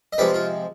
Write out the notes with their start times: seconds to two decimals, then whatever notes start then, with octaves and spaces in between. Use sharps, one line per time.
0.13 D#5
0.18 C3 F3 G#3 B4 D5
0.34 F4